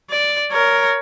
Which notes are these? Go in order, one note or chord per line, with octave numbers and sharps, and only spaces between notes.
D5
A#4 C#5